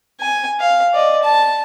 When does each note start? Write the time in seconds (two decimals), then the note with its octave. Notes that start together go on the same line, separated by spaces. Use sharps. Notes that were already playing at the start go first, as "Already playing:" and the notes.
0.21 G#5
0.60 F5
0.94 D5 D#5
1.23 A5